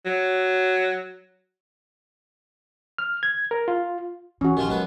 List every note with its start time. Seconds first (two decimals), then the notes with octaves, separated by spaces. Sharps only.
0.06 F#3
2.98 F6
3.23 G#6
3.51 A#4
3.68 F4
4.41 E3 C#4 F#4
4.57 A#1 D#3 F3 F4 G4
4.69 F#2 G#3 B3 B4